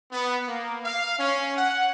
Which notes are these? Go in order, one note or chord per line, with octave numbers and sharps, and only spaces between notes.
B3
A#3
F5
C#4
F#5